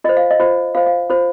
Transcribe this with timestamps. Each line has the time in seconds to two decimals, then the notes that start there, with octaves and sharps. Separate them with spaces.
0.04 F4 C5 D#5
0.17 F5
0.31 D#5
0.40 F4 C5
0.75 F4 C5 F5
0.86 F5
1.10 F4 C5